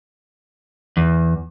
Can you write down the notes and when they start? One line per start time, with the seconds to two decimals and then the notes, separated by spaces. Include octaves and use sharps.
0.97 E2